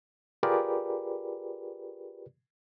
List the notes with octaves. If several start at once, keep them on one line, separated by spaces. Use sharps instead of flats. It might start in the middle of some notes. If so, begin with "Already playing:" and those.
F4 G4 G#4 A#4 B4 D5